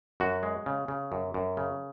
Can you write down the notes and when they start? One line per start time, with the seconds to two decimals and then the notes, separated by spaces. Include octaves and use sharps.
0.20 F#2 F#4
0.43 G#3
0.66 C#3
0.88 C#3
1.12 F#2
1.34 F#2
1.57 C#3